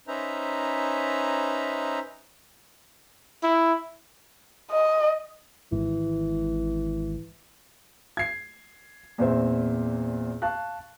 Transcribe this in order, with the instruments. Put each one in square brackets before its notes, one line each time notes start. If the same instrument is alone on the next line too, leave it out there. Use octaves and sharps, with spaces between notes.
[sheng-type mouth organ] C#4 D#4 B4 C5 E5 A#5
[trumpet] E4
[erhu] D#5
[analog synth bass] G#1 [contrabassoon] E3
[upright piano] G#6 C7
E2 A#2 C4 C5 E5
F5 A5 C#6 F#6